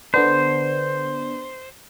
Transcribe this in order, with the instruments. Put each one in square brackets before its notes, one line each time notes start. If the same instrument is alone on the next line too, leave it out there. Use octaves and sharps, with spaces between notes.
[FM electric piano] D3 B3 D4 [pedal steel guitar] C5